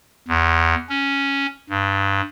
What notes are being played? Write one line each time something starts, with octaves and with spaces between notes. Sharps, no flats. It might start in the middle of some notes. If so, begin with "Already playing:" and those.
E2
C#4
G2